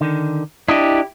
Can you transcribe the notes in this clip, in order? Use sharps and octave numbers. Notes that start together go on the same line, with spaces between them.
D3 D#3
D4 E4 G4 D#5